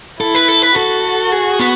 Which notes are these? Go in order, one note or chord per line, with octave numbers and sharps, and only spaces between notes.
E4 A4
B4
A4
B4
F#4 A4
G#4
B3